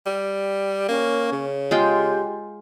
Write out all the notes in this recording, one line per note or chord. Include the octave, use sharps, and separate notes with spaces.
G3
A#3 C#4
C#3
G#3 F4 G4 G5